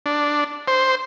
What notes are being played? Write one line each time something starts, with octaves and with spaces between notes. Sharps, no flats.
D4
C5